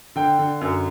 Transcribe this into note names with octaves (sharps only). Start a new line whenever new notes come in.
D3 G5
D3
F#2